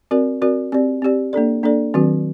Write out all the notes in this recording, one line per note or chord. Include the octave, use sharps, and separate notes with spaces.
C4 F#4 A#4 D5
C4 F#4 A#4 D5
C4 G4 D5
C4 G4 D5
A#3 D4 A4 D5
A#3 D4 A4 D5
D#3 F#3 C4 F#4